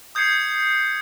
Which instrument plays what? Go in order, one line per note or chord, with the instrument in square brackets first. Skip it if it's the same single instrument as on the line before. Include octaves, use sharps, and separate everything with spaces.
[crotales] D#6 G6 G#6 C7 C#7